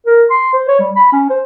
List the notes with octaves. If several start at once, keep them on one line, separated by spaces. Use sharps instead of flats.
A#4
C6
C5
C#5
G3
B5
C#4
C5